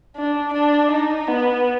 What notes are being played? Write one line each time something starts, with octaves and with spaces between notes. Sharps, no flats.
D4
D4
D#4
B3